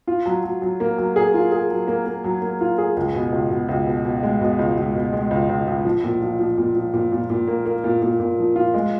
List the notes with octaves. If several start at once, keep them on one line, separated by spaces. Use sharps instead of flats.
F4
F#3
F#3
F#3
A#3
F#3
G#4
F4
G#4
F#3
A#3
A#3
F#3
A#3
F4
G#4
C#2
B2
C#2
B2
C#2
B2
B2
G#3
B2
C#2
C#2
B2
G#3
C#2
C#2
C#2
F3
A#2
F3
F3
A#2
F3
A#2
A#2
A#2
A#3
A#3
A#2
A#2
A#2
F3
F4
G#3